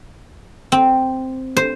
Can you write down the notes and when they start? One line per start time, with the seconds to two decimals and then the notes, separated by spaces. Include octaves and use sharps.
0.72 C4
1.57 C5